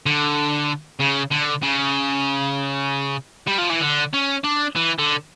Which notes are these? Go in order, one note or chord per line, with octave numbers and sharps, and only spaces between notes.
D3
C#3
D3
C#3
G3
F3
E3
D3
C#4
D4
E3
D3